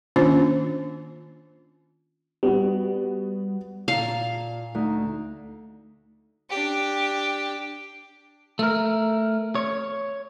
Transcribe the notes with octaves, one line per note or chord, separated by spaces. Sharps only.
D#3 A#3 C#4 D4 F4 C5
G3 B3 F#4
A#2 F5 A5 A#5
D2 D#4
D4 G4
A3 A#4
C#5